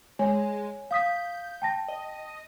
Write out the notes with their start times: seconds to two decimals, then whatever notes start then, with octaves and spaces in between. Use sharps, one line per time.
0.19 G#3 C#5 G#5
0.91 F5 D#6 G6 B6
1.62 G5 A5 A#6
1.88 D#5